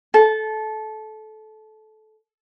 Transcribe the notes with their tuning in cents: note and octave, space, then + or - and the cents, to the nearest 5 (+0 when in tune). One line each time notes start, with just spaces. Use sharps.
A4 -20